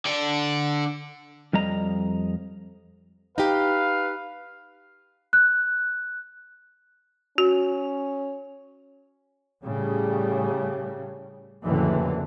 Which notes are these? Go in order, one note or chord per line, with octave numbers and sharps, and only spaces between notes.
D3 D5
F2 G3 D#5 A#5
D#4 G4 B4 F5
F#6
C#4 F#4
A2 C#3 G3
F#1 F2 A2 D3 E3 F#3